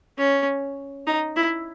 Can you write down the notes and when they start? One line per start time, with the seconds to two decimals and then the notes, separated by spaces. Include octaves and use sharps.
0.18 C#4
1.07 D#4
1.36 E4